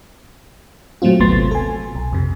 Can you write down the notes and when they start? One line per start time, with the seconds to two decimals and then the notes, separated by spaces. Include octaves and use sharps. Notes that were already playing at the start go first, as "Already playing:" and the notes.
1.02 A#2 F#3 A3 C4 F4
1.20 G#1 D2 A3 B3 C6 A6
1.32 C3
1.51 A4 G#5
1.95 B1
2.13 F2 C3